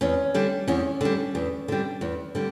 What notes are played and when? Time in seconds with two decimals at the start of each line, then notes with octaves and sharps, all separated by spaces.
0.01 E2 C#4
0.34 D3 G3
0.68 E2 C#4
1.01 D3 G3
1.35 E2
1.68 D3 G3
2.01 E2
2.35 D3 G3